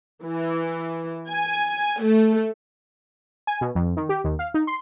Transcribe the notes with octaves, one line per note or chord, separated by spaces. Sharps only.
E3
G#5
A3
G#5
B2
F2
D#3
G4
D#2
F5
D#4
C6